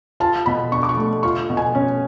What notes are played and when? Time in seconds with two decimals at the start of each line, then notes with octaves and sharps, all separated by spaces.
0.20 F4 A5
0.46 B2 B5
0.72 D4 C#6
0.83 D6
0.89 C#6
0.97 A3
1.23 F4 C#6
1.50 B2
1.57 G#5
1.75 C#4